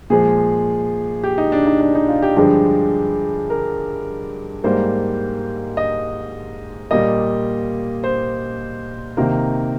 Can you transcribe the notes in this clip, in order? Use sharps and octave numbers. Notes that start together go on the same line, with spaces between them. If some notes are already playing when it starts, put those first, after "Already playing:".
A#2 F3 G#3 G#4
G4
D#4
D4
D#4
D4
D#4
F4
G4
G2 D3 F3 G#3 G4
A#4
G#2 G3 A#3 C5
D#5
A#2 G3 A#3 D#5
C5
C3 D#3 A#3 A#4